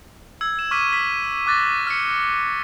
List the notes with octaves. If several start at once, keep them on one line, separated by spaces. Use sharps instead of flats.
E6 G#6
E7
C#6 D6 F6 B6 D#7
B6
D6 F#6 A6 A#6
F6 C#7